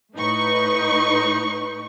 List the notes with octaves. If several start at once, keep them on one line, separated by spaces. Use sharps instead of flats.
A2 D#4 B4 C#6